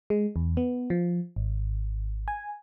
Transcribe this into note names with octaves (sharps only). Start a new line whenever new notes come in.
G#3
E2
B3
F3
G#1
G#5